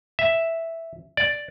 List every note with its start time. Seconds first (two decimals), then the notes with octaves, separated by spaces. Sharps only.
0.19 E5
1.17 D5